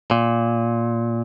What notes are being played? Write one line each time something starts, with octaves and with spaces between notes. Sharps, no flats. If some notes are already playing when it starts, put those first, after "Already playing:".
A#2